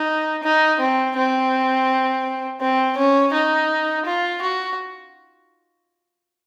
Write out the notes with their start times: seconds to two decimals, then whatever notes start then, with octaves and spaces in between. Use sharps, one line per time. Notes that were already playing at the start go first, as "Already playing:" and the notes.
Already playing: D#4
0.43 D#4
0.80 C4
1.16 C4
2.61 C4
2.97 C#4
3.33 D#4
4.06 F4
4.42 F#4